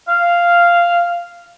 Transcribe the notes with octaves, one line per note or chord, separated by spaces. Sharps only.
F5